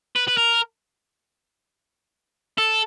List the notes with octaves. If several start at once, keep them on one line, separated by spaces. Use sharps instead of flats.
B4
B4
A#4
A4